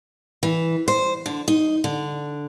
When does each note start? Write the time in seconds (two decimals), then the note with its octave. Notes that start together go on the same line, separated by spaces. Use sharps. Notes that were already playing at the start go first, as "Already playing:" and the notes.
0.43 E3
0.88 C5
1.26 D3
1.48 D#4
1.84 D3